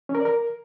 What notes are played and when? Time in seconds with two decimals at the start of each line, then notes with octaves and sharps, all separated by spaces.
0.09 C#4
0.15 A#4
0.20 D5
0.25 A#4